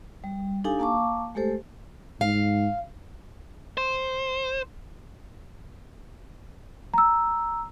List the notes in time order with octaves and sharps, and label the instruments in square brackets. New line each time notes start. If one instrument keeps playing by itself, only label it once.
[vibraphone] G3
D4 D#4 G4 A4 F5 G#5
A#3 F5 A5 C#6 D6
G#3 A3 G4 A4 C5
[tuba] G#2 [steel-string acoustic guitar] F5
[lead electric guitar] C5
[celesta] A#5 E6